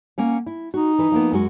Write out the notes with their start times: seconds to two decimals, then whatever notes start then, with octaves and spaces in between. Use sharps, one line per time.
0.18 A#3 C#4 F#5
0.46 E4
0.74 D#4 F#4
0.98 E3 B4
1.12 F3 A#3 B3
1.32 F#2 G#3 F#4